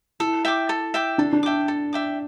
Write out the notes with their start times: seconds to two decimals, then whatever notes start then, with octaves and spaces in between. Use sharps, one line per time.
0.20 E4 A4
0.45 E5 G5 D6
0.69 A4
0.94 E5 G5 D6
1.18 D4 A4
1.33 D4
1.43 E5 G5 D6
1.68 A4
1.93 E5 G5 D6